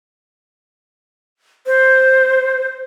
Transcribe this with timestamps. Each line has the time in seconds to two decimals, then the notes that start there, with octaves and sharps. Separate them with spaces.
1.67 C5